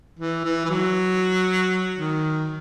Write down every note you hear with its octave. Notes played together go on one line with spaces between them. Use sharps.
E3
E3
E3
F#3
D#3